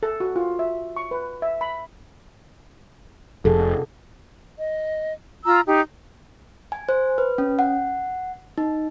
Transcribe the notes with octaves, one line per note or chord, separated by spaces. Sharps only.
A4
F#4
F4
E5
C#6
B4
E5
B5
F1 C3 G#4 A4
D#5
F4 A#5 E6
D#4 G4
G#5
C5
B4
C#4
F#5
D#4